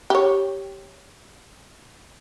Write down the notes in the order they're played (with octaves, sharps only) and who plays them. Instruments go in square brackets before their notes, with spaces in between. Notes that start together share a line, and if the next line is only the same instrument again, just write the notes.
[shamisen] G4 C#5